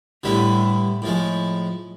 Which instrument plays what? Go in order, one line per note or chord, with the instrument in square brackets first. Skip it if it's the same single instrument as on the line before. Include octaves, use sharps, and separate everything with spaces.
[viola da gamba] A2 [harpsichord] D3 G3 B3 E4
[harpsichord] A2 F3 G#3